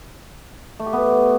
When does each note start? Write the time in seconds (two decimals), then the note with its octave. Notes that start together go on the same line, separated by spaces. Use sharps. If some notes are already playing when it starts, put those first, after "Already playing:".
0.79 A3
0.86 G4
0.93 B3